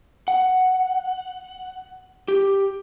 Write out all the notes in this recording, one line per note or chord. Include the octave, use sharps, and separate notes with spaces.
F#5
G4